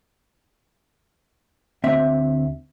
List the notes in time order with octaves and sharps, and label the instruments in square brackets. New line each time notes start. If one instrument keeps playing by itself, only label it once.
[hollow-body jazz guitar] D2 C4 E5